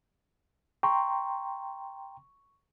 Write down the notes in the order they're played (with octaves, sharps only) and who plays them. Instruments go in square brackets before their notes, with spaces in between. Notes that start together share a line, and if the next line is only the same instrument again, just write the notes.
[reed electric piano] G5 A#5 C6 [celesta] C#6